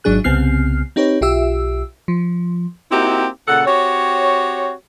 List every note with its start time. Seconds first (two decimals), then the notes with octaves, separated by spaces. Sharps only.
0.04 G#1 G#2 F#3 D4 G#4 F#6
0.24 C2 C#3 B3 C4 F6 C7
0.96 C4 D#4 G4 B4 C#5
1.21 B1 F4 G4 E5 E6
2.08 F3
2.91 A#3 C4 D#4 E4 F#4 G4
3.48 A#2 C#3 A4 F#5
3.66 C4 F#4 G4 C#5